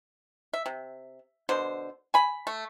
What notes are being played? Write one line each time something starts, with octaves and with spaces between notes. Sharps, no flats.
E5
C3
B2 D3 C5
G#5 B5
A3